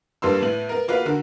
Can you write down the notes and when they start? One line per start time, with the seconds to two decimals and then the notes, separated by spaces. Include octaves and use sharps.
0.22 G2 G3 A#3 B3 C6 E6
0.42 A2 B3 F#7
0.69 B3 A#4
0.88 A#3 F4 F#4 B4
1.06 D3 D#3 F#4